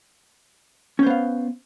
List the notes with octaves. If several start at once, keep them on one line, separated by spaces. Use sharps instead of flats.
B3 C#4 C5 F5